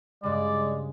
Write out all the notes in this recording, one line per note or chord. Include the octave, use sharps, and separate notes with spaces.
G2 C#3 G#3 D5